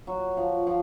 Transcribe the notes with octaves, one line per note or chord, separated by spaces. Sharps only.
F#3
F3
F3